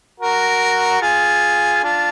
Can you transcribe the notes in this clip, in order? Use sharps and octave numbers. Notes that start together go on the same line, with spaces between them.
F#4 A#4
F4 G#4
D4 F4